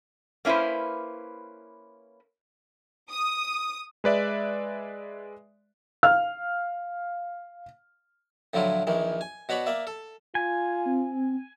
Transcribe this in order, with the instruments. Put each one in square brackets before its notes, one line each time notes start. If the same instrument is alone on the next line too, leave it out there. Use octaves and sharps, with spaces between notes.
[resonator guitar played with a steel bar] A#3 C#4 E4 B4 C5
[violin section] D#6
[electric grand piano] G#3 B4 D5 E5
[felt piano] F5 F6
[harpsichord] A2 D3 F3 F#3 E4 F4
A#1 D#2 D#3 E3
G#5
B2 F#4 C#5 D5 B5 C#6
A#3 D5 E5
A4
[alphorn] F4 [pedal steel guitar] G#5
[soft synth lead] C4